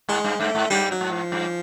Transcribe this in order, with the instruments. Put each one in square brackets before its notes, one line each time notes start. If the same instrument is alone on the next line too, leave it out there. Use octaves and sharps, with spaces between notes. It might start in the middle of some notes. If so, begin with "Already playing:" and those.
[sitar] G#2 [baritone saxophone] G#3
[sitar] G2
[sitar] G2 [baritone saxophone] A3
[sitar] G#2
[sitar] G2 [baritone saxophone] G3
[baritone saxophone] F#3
[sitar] G#2
[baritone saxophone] F3
[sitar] G2